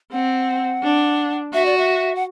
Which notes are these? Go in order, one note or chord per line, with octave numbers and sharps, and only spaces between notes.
C4 F#5
D4
F#4 E5
D5
E5
F#5